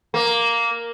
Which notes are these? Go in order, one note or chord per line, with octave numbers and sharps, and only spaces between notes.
A#3